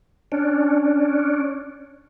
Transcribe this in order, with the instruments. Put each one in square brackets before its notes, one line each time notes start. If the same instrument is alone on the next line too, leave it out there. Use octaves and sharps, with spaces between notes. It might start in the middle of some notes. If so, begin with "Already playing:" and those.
[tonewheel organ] C#4 D4